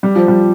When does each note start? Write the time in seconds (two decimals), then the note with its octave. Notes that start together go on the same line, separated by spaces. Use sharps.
0.03 G3
0.16 F3
0.28 G3